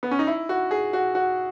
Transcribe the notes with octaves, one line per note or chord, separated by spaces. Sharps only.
B3
C#4
D#4
E4
F#4
G#4
F#4
F#4